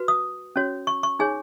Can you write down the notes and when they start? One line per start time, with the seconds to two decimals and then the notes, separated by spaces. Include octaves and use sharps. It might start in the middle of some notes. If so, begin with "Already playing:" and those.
Already playing: F#4 B4
0.08 D#6
0.56 C#4 F#4 C#5
0.87 C#6
1.03 C#6
1.19 D#4 G#4 C#5 G#5